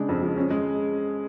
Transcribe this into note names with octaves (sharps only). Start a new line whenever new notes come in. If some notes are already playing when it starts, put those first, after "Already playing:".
Already playing: C#3 G#3 D4
F2
F3
C#4
G#3